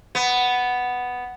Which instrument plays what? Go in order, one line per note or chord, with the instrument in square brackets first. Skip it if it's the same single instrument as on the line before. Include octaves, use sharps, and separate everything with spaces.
[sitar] B3